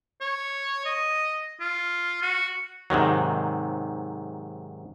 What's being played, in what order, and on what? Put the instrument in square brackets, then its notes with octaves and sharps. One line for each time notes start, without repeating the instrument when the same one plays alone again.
[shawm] C#5
D#5
F4
F#4
[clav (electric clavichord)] G#2 C3 D#3 F#3